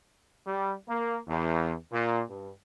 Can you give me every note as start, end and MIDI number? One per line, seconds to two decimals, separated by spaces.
0.46 0.73 55
0.88 1.17 58
1.28 1.73 40
1.91 2.21 46
2.29 2.50 43